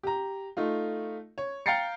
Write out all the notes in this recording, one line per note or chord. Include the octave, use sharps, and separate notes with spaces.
G4 A#5
A3 D#4 F4
C#5
F5 G5 A#5 A6 C7 C#7